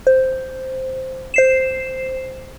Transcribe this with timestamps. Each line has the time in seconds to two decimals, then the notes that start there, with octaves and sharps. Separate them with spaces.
0.07 C5
1.34 C5 C7 E7